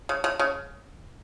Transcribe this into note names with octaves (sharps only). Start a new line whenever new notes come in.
C#3
C#3
C#3